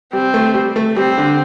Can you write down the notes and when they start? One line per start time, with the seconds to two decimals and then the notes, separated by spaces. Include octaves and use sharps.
0.13 G3 C4
0.34 A3
0.54 G3
0.76 A3
0.96 G3 C4
1.18 D3